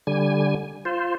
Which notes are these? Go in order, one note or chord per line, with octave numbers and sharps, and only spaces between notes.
D3 G3 G#5
F4 C5